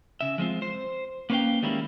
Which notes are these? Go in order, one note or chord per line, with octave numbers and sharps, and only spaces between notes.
C#3 E5
F3 G#3 C4 F4
C5
A#3 B3 C#4 B4 F5 G5
D#3 G3 G#3 A#3 C#4 E4